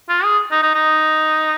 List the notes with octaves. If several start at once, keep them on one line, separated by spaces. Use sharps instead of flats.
F4
G#4
D#4
D#4
D#4